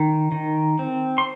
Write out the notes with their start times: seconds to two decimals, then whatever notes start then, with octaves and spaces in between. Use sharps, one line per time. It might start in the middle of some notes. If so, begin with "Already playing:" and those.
Already playing: D#3
0.32 D#3
0.79 C4
1.18 C6